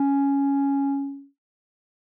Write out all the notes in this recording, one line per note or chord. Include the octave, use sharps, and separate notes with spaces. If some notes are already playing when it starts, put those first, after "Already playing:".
Already playing: C#4